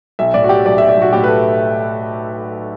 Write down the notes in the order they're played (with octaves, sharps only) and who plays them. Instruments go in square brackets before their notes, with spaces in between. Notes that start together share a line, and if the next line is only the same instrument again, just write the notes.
[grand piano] B1 E5
A2 D5
F#4
F#3 G4
B1 D5
E5
B1
D5
B1
F#4
A2 G4
B4
A4